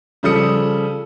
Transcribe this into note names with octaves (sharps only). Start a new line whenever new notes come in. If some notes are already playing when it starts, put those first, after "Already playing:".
C#3 F3 G3 A4 D#6 C#7